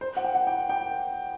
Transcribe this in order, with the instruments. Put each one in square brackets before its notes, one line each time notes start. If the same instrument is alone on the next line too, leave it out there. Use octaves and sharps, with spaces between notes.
[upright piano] C5
F#5
G5
F#5
G5
G5